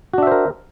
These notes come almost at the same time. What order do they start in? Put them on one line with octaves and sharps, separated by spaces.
F#4 D4 E5 C5 A#4